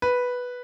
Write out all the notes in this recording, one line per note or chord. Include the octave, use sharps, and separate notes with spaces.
B4